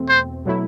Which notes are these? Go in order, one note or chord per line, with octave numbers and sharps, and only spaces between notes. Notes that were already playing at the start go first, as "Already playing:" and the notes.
Already playing: E2 B2 A3 C4
C5
B2 F#3 A3 E4